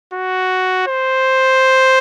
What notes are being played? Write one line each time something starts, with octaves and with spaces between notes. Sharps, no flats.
F#4
C5